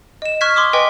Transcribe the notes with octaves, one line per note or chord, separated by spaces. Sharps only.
D#5 E7
C#6 F6 F#6 G#6 B6
C6 D6 D#6
B4 D#5 G5 G#5 B6